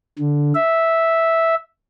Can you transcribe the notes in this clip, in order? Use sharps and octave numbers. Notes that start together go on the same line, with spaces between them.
D3
E5